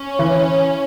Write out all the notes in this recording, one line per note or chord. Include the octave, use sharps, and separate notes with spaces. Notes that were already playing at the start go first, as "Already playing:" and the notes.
Already playing: C#4
E3